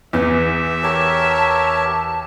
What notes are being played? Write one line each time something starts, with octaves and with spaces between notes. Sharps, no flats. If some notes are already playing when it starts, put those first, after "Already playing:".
E2 B4 E5
G4 A#4 C#5 A5